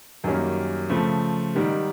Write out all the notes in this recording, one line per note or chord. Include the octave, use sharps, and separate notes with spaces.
F#2 D#3 G3 A#3 C#4
C#3 F3 A3 C4
G#2 D#3 G3